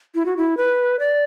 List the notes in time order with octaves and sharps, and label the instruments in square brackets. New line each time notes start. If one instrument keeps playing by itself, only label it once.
[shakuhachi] E4
F#4
E4
B4
D5